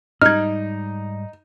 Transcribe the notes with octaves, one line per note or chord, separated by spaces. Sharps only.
G#2 G3 D#4 F6 G#6